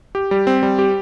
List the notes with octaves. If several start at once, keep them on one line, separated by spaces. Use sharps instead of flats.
G4
G3
C4
G3
G4